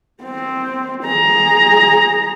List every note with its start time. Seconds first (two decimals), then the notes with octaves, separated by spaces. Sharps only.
0.23 C4
1.06 G#4 A#5